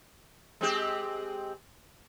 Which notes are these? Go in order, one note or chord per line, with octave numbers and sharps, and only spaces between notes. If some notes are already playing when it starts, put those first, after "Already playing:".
G#3 C4 G4